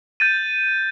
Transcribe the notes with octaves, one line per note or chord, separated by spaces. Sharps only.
G6 A6 D#7